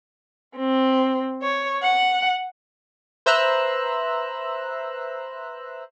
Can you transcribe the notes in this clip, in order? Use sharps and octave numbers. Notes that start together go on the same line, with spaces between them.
C4
C#5
F#5
B4 C5 E5 A#5 E6 F#6